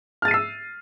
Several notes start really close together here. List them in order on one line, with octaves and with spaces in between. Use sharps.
F6 A6 D#7 C7 E6